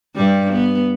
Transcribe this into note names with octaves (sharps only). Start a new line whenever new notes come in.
G2 G3
B3